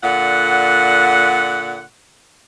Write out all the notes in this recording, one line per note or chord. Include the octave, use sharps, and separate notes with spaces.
A#2 D3 F#5